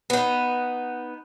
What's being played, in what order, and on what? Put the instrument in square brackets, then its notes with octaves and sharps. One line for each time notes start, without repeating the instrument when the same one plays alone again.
[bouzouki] B3 D#4